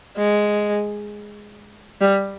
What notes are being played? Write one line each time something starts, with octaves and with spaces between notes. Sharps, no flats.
G#3
G3